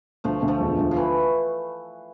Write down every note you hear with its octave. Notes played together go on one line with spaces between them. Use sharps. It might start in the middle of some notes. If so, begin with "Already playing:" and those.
D2 F3 A3
D2
F3 A3
E1
D2
F3
E3